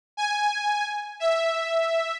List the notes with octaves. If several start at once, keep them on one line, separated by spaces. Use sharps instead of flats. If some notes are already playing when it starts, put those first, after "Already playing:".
G#5
E5